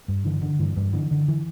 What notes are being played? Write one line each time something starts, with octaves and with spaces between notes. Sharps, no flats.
G2
D3 E3
D3
G2 E3
G2
D3 E3
D3
E3